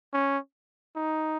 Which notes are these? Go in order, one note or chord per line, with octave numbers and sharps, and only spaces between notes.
C#4
D#4